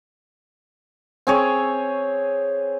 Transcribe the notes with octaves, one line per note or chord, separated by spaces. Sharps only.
C4 G#4 C#5